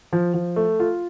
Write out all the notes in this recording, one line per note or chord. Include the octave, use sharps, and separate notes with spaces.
F3
F3
A3
F4